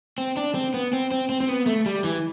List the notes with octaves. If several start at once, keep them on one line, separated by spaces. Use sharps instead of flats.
C4
D4
C4
B3
C4
C4
C4
C4
B3
A3
G3
E3